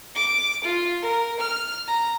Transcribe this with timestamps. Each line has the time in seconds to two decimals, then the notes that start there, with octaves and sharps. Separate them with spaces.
0.16 D6
0.64 F4
1.02 A#4
1.40 F6
1.87 A#5